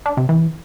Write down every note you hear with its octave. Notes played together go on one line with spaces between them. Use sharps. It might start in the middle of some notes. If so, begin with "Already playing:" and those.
D4
C3
E3